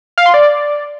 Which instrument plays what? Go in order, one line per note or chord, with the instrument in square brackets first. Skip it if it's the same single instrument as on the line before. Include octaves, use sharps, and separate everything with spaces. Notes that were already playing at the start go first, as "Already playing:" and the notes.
[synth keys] F5
C6
D5